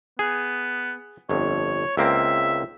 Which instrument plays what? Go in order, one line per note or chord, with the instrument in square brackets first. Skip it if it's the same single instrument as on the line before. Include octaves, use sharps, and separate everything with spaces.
[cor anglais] B3 [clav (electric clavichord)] G#4
[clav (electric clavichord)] G1 F2 [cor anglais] C#5
[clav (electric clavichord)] C#2 A#3 C4 [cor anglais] E5